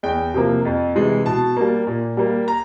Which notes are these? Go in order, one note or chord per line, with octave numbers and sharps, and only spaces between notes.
E2 G5
C3 F3 A#3
F2
C3 E3 G#3
B2 A5
G3 A#3
A#2
G3 A#3
A#5